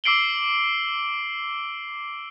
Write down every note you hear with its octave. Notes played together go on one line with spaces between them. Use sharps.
D6 E6 C7 D7 F#7 G7